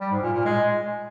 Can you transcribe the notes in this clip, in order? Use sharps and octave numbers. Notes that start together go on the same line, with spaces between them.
G3
G#2
A#2
A#2
G#3